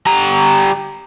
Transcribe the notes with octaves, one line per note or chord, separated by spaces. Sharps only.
G3 A#5